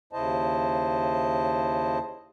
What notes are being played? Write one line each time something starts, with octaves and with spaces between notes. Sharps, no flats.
D#2 C#3 E4 C5 D#5 A5